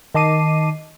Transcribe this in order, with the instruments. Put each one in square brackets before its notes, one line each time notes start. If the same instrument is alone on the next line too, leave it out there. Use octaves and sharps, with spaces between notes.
[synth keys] D#3 D#5 A5 D6 C7 D#7